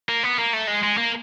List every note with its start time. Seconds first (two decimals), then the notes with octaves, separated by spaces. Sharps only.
0.09 A#3
0.23 B3
0.38 A#3
0.53 A3
0.67 G#3
0.83 G#3
0.97 A#3